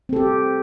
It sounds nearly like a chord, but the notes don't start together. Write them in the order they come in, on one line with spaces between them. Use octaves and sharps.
C4 A4 G4